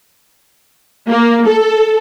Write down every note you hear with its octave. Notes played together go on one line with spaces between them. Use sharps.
A#3
A4